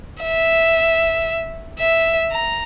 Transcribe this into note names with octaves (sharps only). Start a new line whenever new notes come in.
E5
E5
A#5